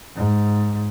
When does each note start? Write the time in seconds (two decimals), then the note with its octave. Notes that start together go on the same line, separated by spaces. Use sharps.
0.16 G#2